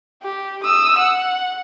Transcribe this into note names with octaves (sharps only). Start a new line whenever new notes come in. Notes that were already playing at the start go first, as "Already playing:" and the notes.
G4
D#6 E6
F#5